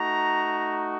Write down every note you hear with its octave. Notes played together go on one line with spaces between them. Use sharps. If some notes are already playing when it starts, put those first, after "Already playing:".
Already playing: A3 D#4 F#4 A#5